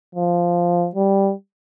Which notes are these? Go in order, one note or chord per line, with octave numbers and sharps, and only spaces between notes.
F3
G3